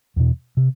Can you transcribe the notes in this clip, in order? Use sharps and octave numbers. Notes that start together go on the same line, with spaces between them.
E2 B2
C3